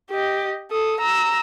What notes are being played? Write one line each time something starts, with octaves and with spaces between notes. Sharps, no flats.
G4 D#5
A4 D#6
A#5 E6